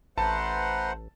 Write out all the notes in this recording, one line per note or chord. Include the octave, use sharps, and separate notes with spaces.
A1 A3 B4 C5 F#5 A5 A#5 C6